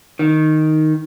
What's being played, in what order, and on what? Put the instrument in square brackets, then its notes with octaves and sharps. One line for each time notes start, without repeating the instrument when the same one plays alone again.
[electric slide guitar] D#3